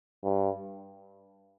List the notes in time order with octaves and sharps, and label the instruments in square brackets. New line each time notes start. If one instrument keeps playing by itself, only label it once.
[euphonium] G2